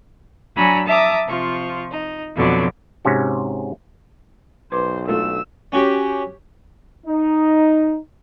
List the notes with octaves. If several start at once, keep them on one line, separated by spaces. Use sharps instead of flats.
F#3 D4 G#5 A#5 B5 E6
E5 A5 A#5 D6 D#6
C3 F3 F4 C#6
D#4
F2 B2 D3 F#3 D6
G#2 C3 C#4 F#4
B1 B4 C5 C6 D6
A3 D4 F4 A4 E6
C#4 F#4 G4
D#4